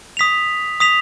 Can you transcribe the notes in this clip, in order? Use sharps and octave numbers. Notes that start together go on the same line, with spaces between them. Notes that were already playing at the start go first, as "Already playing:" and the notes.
D#6 B6 F7
D#6 B6 F7